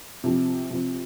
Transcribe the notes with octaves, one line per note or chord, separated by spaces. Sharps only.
C3 F3 C4
C3 F3 C4